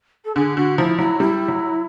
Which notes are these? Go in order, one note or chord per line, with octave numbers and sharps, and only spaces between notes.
A4
D3 G#4
D3 F#4
F3 E4
F#3 E4
G3 E4
F#3